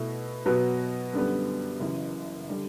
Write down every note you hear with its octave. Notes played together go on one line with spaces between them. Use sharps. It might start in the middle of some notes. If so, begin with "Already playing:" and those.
Already playing: B2 A3 E4
B2 F#3 B3 F#4
F#2 D3 G3 B3
F#1 F#2 E3
D3 G3